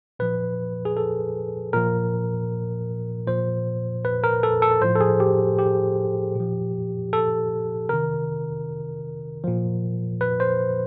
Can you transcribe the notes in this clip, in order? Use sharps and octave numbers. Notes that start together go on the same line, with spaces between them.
A#2 F3 B4
G#4
A4
A#2 F3 A#4
A#2 F3 C5
B4
A#4
A4
A4
A2 F3 C5
A4
G#4
G4
G4
A#2 F3
A4
C3 D#3 A#4
A#2 F3
B4
C5